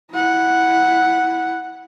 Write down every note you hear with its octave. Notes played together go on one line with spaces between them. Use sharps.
E4 F#5